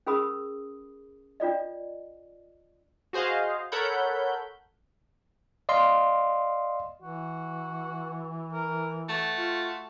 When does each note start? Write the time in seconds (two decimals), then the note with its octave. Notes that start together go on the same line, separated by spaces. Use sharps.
0.07 C#4 G#4 A#4 B5 D#6
1.40 D4 F4 D5 D#5
3.13 F#4 G#4 C5 D#5 F5
3.72 A4 A#4 C#5 F#5 B5 G6
5.69 D5 D#5 F5 C6
7.01 E3 F#4
8.53 A#4
9.09 A3 F#4
9.38 F4